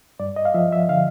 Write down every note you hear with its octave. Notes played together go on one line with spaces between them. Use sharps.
G2 D5
D#5
F5
F3 E5
E5
D3 F5